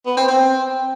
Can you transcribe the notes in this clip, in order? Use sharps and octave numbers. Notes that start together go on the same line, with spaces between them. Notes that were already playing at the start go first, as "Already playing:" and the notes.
B3
C4
C4